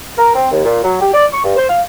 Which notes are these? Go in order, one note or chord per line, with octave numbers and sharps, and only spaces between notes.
A#4
C4
D#2
A#2
F#3
G4
D5
C#6
G2
C5
F5